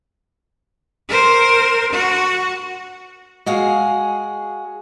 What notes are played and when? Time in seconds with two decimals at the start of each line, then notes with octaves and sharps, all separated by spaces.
1.09 A#4 C5
1.92 F#4
3.46 G#3 F#4 G#4 F5